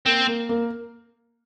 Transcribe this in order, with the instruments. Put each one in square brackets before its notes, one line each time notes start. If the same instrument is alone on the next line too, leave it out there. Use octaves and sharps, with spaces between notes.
[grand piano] A#3 [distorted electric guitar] C4
[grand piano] A#3
A#3